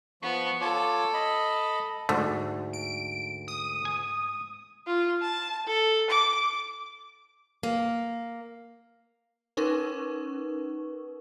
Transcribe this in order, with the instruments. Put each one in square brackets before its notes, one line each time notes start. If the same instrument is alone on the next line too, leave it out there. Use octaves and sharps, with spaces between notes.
[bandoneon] F3 C#6 [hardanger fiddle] B3
[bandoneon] F4 C#5 D6 [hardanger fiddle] A4
[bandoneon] D#5 B5
[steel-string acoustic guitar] D2 [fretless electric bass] G#2 [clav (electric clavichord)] D3 F3 A3
[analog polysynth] D7
D#6
[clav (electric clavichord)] G#5
[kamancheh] F4
A5
A4
D6
[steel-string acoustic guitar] A#3
[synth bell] C#4 D#4 A#4 B4 C#6